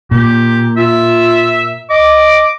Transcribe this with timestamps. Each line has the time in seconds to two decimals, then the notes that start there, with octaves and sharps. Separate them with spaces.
0.11 A#2 G4
0.77 F4 E5
1.90 D#5 D6